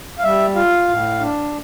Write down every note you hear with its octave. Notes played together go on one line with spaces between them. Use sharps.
F5
G3 E5
F4 F5
A2
D4